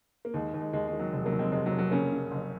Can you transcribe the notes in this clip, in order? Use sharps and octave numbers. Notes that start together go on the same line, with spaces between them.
A#3
D#2 G#3
D#2
G#3
D#2 G#3
G#3
D#3
F#3
F1 G#3
F#3 A#3
F1
G#3 C4
F1 G#3
F#3
F1
F#3 A#3
C#3 A#3 C#4
C#3
F#1